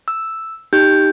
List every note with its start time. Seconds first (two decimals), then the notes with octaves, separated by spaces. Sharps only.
0.08 E6
0.73 D#4 G4 G6